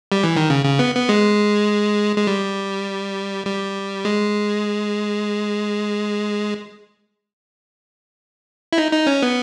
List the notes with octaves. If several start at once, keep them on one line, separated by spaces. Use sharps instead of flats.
G3
E3
D#3
C#3
C#3
B3
B3
G#3
G#3
G3
G3
G#3
E4
D#4
D#4
C#4
B3